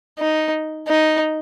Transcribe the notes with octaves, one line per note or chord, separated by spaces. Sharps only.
D#4
D#4